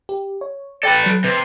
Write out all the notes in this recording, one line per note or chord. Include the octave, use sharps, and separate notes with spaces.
G4
C#5
A4 B4 D5 G5 D6
F#3
C3 B4